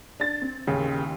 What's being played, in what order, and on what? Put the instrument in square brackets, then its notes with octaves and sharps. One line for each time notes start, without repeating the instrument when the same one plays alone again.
[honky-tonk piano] D4 A6
C4
[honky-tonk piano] A1 D#2 [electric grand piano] C#3